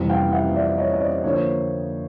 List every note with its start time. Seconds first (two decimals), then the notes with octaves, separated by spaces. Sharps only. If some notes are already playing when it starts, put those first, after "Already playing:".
Already playing: F2 C3 E3 G3
0.09 F5 G5
0.32 E5 F#5
0.56 D5 E5
0.78 C#5 D#5
0.93 D#5
1.01 C5 D5
1.24 D3 F3 A#3 D4 C#5
1.34 C5